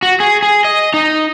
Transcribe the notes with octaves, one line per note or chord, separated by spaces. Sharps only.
F#4
G#4
G#4
D#5
D#4